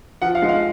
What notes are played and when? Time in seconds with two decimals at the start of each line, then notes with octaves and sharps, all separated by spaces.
0.22 F3 F#5
0.35 F5
0.42 G#3
0.49 F5